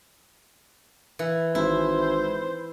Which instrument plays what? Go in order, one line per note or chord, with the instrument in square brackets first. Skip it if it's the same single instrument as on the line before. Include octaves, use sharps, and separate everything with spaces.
[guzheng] E3
[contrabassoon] G#1 [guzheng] E4 [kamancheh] C5